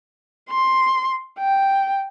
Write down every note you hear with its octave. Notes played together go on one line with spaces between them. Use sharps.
C6
G5